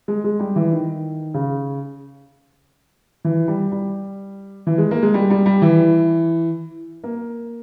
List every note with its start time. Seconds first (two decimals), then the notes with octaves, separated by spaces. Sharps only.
0.08 G#3
0.24 G#3
0.40 G3
0.56 E3
0.72 D#3
1.34 C#3
3.25 E3
3.48 G3
3.72 G3
4.67 E3
4.78 G#3
4.91 A#3
5.03 G#3
5.14 G3
5.30 G3
5.46 G3
5.62 E3
7.04 A#3